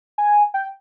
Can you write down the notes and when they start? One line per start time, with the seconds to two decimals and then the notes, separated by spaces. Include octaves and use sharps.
0.18 G#5
0.54 G5